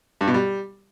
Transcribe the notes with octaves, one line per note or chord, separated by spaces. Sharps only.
G2
B2
G3